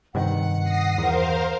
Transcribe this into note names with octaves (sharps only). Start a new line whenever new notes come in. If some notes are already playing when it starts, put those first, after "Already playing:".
G2 C3 D#3 F#5
D#6 A#6 C7
E2 A#4 C5 F5